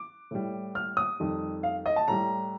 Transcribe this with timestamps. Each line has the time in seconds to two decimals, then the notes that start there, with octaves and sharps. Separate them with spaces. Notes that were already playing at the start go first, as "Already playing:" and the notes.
Already playing: D6
0.31 A2 G3
0.75 F6
0.97 D#6
1.20 F2 D#3 G3
1.63 F5
1.86 D#5
1.96 A5
2.08 A2 G3 A#5